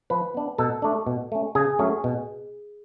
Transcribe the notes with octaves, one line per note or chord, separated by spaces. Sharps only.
F3 B4
B3 D4
B2 A4
A3 D4
B2
A3 C#4
C#3 G#4
F#3 A3 C#4
B2